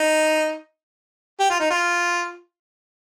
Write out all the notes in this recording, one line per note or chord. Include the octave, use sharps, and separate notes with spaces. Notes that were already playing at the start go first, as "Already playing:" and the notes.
Already playing: D#4
G4
F4
D#4
F4